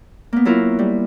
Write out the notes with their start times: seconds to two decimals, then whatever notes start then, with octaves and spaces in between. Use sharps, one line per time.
0.33 A#3 B3
0.45 F#3 E4 F4 A#4
0.79 G3